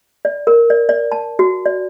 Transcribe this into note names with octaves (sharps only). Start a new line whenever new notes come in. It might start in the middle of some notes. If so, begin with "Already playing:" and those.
D5
A#4
D5
D5
A5
F#4
D5